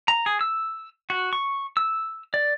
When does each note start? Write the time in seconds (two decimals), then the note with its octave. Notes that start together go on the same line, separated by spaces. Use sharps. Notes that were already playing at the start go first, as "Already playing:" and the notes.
0.08 A#5
0.26 G#4
0.41 E6
1.10 F#4
1.33 C#6
1.77 E6
2.34 D5